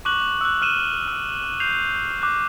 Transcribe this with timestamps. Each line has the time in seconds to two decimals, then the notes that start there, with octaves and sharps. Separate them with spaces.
0.05 C#6 D6 F#6 F#7
0.41 E6 F#6
0.62 F6 D#7 E7
1.08 E6
1.60 G6 C7 F7
2.22 D6 F#6